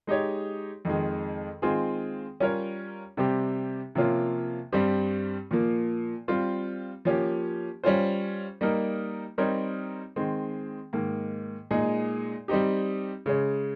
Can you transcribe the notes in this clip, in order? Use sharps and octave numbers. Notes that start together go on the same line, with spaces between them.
G#3 D#4 G4 C#5
F2 D#3 G#3
D#3 G#3 C4 F4 G#4
G3 C#4 F4 A#4 C#5
C3 G3 C4 G4
C3 F3 A#3 C#4 F4
G2 G3 C4 G4
A#2 F3 A#3
G3 C4 F4
F3 A#3 C#4 G4
G3 C#4 F4 C5
G3 A#3 D#4 A#4
G3 C4 D#4 A#4 C#5
D#3 G#3 C4
G#2 D#3 A#3
A#2 G#3 D#4 G#4
G3 C4 D#4 G4
C#3 G#3 C#4